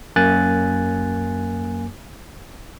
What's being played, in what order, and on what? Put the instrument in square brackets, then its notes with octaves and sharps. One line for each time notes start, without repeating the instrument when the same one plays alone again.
[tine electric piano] F#2 A#3 G#5 F#6 A6